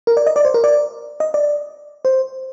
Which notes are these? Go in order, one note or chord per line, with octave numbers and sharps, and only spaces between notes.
A#4
D5
D#5
D5
C5
A#4
D5
D#5
D5
C5